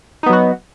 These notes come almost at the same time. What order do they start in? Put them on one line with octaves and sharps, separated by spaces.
D#4 B3 F#3 F#4